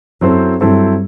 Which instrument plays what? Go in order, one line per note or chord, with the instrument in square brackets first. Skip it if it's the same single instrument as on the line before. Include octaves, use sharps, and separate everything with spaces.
[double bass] F#2 [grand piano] F#3 C4 E4 A4 C5
[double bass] G2 [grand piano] F#3 C4 E4 A4 C5